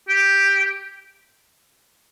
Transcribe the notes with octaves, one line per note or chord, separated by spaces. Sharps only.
G4